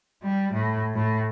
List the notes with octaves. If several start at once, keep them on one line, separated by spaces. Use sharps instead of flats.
G3
A2
A2